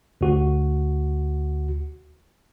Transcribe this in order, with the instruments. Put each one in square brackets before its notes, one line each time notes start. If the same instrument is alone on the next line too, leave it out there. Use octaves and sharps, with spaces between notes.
[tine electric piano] D2 F#4